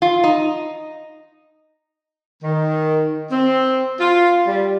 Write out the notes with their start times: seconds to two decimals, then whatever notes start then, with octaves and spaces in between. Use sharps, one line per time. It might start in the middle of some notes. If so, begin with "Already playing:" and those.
0.02 F4
0.24 D#4
2.43 D#3
3.31 C4
4.00 F4
4.47 G3